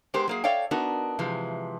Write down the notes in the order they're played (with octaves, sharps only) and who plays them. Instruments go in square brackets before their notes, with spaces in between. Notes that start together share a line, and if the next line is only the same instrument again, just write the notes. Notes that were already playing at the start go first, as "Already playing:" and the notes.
[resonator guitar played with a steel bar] G#3 B3 G4 A#4 C5
F#3 A#3 G#4
A4 C#5 D5 F5 G5
B3 D4 D#4 F#4 A#4
C3 E3 F3 G#3